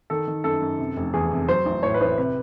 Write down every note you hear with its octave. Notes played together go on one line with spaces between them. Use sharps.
D#3 A4
D#3
F#2 A4
F#2
C3
F1
E2 G#4
C3
F#3 C5
A1
A2 C#5
B4
A1 C5
C3 B4